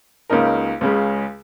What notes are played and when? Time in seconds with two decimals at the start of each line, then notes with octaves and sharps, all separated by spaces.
0.30 C#2 C#3 A#3 D#4 A#4
0.81 C#2 C#3 G#3